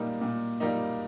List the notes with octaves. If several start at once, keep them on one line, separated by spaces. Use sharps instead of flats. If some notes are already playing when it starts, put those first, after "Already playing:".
Already playing: A#2 G3 A#3 D#4
A#2
G3 A#3 D#4